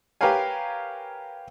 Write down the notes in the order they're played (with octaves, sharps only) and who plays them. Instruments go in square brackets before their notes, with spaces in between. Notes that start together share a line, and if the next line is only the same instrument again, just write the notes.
[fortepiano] G4 A#4 B4 C#5 F5 G#5